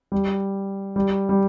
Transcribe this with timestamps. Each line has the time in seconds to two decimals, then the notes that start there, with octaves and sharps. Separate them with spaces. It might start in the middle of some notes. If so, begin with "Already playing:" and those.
0.12 G3
0.96 G3
1.29 G3